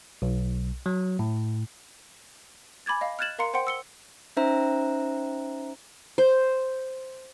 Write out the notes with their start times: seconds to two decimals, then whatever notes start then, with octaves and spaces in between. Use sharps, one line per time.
0.22 B1
0.86 F#3
1.19 A2
2.86 G#5 B5 D6 G#6 A6
3.01 D#5 F5
3.19 F6 F#6 G#6 A6 E7 F#7
3.39 A#4 F5 A#5 C6 C#7
3.54 C5 F#5 G5 C6 C#7
3.67 E6 C#7 G7
4.37 C#4 D#4 C5 E5 A#5
6.18 C5